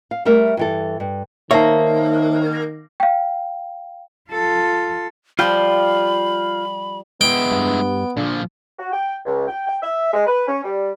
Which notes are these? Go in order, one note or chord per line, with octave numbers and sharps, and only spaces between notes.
F5
G3 A3 A#4 E5
G2 E3 A4
G2
D#3 A#3 D#4 C5 C#5 E5 A5
F5 G5
F4 A4
F3 G3 F4 G5 B5
G#3 B3 E4 G5
G2
A#2 D3 F3
F#4
G5
C#2
G5
G5
E5
G#3
B4
C#4
G3